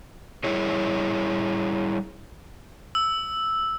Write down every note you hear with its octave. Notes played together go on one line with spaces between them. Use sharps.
G3 E4 G#4 C#5
E6